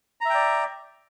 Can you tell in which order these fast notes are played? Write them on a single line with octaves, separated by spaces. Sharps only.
A#5 E5 G5 D5